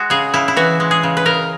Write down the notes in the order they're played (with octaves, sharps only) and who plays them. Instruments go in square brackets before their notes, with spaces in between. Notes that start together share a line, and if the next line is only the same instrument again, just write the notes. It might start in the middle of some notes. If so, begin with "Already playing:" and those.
Already playing: [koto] G#3 F#4
C#3 G#4
C#3 E4
E4
E3 F#4
G#3
G#4
C#3
B4
C#3 A#4